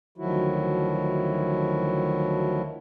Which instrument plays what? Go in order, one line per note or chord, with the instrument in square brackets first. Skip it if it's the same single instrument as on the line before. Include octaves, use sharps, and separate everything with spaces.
[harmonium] D2 D#3 F3 F#3 E4 F#4